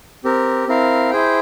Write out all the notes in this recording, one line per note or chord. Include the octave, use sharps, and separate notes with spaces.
C4 G4 A#4
C4 E4 A#4 F5
E4 G#4 C5 G5